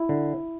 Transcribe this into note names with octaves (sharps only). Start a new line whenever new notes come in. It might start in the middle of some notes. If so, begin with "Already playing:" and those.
Already playing: E4
D3